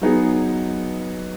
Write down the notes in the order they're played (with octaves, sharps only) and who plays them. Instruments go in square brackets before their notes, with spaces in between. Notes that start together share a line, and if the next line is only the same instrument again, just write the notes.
[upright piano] F#3 B3 D#4 G#4 D#5